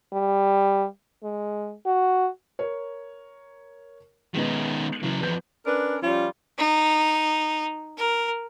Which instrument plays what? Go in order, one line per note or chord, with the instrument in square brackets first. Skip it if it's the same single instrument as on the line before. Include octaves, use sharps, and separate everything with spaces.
[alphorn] G3
G#3
F#4
[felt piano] A#4 C#5
[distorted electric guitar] D#3 C#4 [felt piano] G#3 B3 D#4
[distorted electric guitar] C#3 F#3 [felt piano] E3
[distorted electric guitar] E2 F3 [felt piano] B4 G6
[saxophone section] C#4 D4 A#4 B4
F3 G3 C#4 F4
[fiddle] D#4
A#4